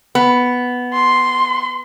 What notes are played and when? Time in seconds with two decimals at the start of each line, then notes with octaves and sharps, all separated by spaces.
0.15 B3
0.94 C6